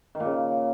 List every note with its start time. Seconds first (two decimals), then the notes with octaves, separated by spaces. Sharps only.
0.15 D#3
0.20 A#2
0.25 C#3